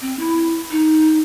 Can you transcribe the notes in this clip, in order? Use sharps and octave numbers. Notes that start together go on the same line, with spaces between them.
C4
E4
D#4